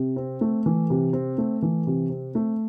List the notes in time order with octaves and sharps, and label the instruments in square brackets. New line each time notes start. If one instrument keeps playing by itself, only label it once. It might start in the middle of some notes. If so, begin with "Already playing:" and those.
Already playing: [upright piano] C3
C4
A3
E3
C3
C4
A3
E3
C3
C4
A3